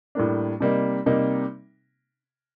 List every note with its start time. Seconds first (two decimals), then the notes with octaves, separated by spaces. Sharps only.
0.15 A2 G3 A#3 D4
0.60 C3 G3 A#3 D#4
1.06 C3 G3 A#3 D#4